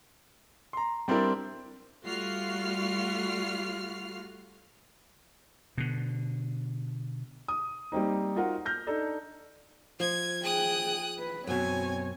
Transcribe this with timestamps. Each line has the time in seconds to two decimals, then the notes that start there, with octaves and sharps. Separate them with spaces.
0.73 A#5 C6
1.08 G3 C4 D4 E4 A#4 D5
2.05 G3 A3 F4 F#4 F6 C7
5.78 B2 D3
7.48 D#6
7.92 G3 A#3 C4 D#4
8.36 D#4 F4 F#4 A#4 F#5
8.66 F6 G6 A#6
8.87 D4 D#4 A4
10.00 F3 G#6
10.44 G#4 G5 D#6 F#6
11.19 B4
11.47 F#2 B2 C4 C#5 G#5